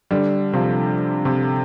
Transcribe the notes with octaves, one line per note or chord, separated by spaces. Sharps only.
D3 G3
C3 F3
C3